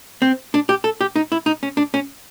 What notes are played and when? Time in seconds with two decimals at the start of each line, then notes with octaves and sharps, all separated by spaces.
0.22 C4
0.54 D4
0.69 G4
0.84 A4
1.01 G4
1.16 D#4
1.32 E4
1.46 D#4
1.63 C#4
1.77 D4
1.94 C#4